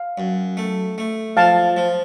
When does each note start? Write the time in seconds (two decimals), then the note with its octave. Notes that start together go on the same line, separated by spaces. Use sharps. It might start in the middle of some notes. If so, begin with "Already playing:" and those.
Already playing: F5
0.18 F#2
0.57 A3
0.98 A3
1.37 F3 F5 A5
1.77 F3